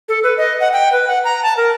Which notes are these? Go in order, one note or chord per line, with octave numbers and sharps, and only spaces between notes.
A4
B4
D#5
F#5
G5
B4
F#5
A#5
A5
A#4